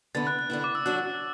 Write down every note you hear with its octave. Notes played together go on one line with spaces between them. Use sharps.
D3 B3 E4 A6
F#6
F#6
D3 B3 E4
D6
E6
F#3 D4 F#4 F#6